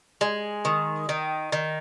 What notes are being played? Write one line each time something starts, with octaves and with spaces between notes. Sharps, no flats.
G#3
D#3
D#3
D#3